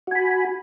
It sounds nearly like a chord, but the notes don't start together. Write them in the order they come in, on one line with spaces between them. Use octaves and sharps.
F#4 G#5 B5